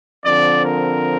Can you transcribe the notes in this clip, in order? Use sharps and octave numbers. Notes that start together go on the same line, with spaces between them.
D3 F3 C4 D5
A#4